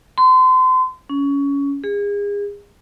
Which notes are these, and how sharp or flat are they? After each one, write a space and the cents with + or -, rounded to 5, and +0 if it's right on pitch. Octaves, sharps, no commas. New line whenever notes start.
C6 -35
C#4 +20
G#4 -35